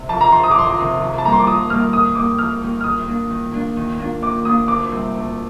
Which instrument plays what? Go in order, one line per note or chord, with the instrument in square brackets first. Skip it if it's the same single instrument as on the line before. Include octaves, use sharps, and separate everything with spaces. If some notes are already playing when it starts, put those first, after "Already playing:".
Already playing: [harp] C3
[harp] F2 [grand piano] A5
[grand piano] A#5
[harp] C3 D#3 [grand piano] C6
[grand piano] D#6
D6
[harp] F2 [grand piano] C6
[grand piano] D6
[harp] C3 D#3
F2
[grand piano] A5
[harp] D#3 G3 A#3 D#4 [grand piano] A#5
[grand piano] C6
D6
[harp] F2 [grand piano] D#6
[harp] D#3 G3 A#3 D#4 [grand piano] F6
[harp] F2 [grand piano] D#6
[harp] D#3 G3 A#3 D#4 [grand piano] D6
[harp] F2 [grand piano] F6
[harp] D#3 G3 A#3 D#4
[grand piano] F6
[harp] D#3 [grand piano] D#6
[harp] A#3 D4 F4
D#3
A#3 D4 F4
D#3
A#3 D4 F4
[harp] D#3 [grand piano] D6
[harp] A#3 D4 F4 [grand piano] D#6
[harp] D2 [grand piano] D6
[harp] C3 G3 C4 D#4
D2